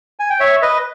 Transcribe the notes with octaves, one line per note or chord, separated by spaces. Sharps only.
G#5
G5
C#5 E5
B4 D#5